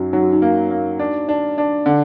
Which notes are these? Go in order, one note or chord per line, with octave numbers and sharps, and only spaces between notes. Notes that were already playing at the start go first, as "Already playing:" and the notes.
Already playing: F#2 F#3 D#4 F#4
F#3 D#4
F#4
D#4
A#3
A#3
D4
D4
D4
D3